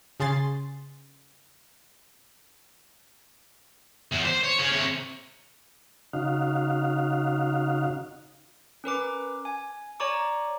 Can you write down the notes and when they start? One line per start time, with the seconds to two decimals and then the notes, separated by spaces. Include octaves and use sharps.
0.20 C#3 G#4 C6 A6
4.12 E2
4.26 C5
4.43 C#5
4.59 C#4 G#4
4.72 C3 C#5
6.13 C#3 D#4 F#4 F5
8.84 C#4 A#4 B4 D6
9.45 G#5
10.00 C#5 D5 A#5 C#6 D6